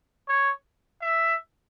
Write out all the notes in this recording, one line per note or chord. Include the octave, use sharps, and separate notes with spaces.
C#5
E5